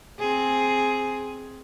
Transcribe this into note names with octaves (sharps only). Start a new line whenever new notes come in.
C4 G#4